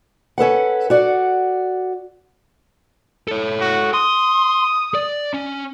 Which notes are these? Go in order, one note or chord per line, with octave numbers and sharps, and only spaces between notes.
C#4 A4 B4 F#5
F#4 D5 F#5
A4 C#5
F#4
C6 D#6
D5
C#4